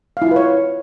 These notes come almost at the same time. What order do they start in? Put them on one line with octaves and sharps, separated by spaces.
F5 E4 F4 B4 C#5